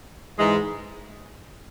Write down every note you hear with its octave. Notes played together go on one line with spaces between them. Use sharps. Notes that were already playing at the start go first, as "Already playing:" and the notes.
G#2 E3 G#3